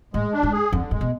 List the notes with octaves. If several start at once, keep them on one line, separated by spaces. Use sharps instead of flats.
A2 G#3
D4
G#2
G#4
F2 D3
G#2 G#3
B2